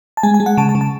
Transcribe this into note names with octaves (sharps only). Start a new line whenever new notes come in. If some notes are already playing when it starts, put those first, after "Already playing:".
A5
G#3 G#5
G#5
G#3
F#5
C#3 A5
A5
C#3
A5